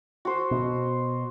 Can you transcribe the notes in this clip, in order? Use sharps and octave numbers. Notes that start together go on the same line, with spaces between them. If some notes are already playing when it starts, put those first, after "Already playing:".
F#4 C5
B2